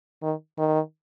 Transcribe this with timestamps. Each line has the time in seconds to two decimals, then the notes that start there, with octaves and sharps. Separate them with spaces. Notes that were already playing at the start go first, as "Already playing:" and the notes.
0.23 D#3
0.58 D#3